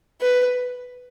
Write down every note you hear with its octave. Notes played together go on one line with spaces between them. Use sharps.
B4